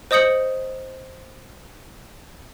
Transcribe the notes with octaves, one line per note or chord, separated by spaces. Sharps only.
C5 D#5 D#6 G6 C#7 F#7